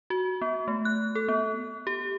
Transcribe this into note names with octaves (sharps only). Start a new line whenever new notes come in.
F#4
B3
A3
F#6
A4
B3
G4